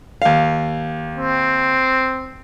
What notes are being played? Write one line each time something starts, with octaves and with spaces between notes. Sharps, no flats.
D#2 F5
C4